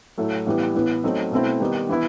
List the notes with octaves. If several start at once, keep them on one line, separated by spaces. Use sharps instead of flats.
A2 F#3 A3
A2 E3 G3 B3
A2 E3 B3
F#3 A3 C4 D#4
B2 A3 C4 E4
D#3 G3 B3 D#4
E3 B3 E4